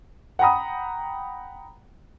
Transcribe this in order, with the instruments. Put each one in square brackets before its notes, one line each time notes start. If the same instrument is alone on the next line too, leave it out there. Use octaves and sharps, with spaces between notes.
[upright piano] F#5 G5 A#5 B5 D#6